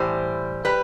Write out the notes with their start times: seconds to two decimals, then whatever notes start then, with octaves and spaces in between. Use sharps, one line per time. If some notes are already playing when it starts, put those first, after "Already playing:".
Already playing: A2 E3 G3 C5
0.65 G3 B4